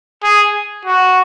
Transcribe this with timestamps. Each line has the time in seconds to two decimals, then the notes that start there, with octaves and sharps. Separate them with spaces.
0.23 G#4
0.85 F#4